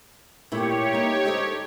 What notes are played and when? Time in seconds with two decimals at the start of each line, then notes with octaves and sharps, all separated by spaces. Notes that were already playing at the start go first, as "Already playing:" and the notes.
0.52 A#2 A3 E4 G4 C#5
0.93 A#3 D#4
1.25 D#4 A4 C5